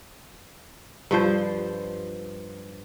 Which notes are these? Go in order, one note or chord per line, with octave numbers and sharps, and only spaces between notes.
G2 F3 C5